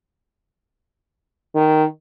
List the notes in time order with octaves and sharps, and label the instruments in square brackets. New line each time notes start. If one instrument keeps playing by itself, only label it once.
[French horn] D#3